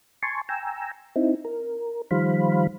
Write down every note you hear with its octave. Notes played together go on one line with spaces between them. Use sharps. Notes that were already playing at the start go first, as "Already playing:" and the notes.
G#5 A5 C6 C#6
G5 G#5 A#5 E6
C4 D#4 E4
A#4
D#3 F3 G3 C5 F5 B5